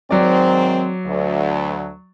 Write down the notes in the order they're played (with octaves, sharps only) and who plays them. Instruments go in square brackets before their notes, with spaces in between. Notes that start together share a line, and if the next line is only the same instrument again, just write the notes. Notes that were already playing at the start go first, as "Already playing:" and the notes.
[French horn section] G#2 D#3 C4 [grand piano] F#3 D5
[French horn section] D2